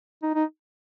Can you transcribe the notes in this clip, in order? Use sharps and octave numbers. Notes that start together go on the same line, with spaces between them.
D#4
D#4